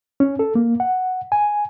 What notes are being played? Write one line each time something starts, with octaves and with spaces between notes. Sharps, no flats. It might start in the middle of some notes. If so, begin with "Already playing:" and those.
C#4
A4
A#3
F#5
G#5